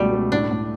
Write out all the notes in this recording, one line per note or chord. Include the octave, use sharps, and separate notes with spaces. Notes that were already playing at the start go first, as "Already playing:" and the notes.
Already playing: C#2 B2 G3 A3
A3
A2 D4
A2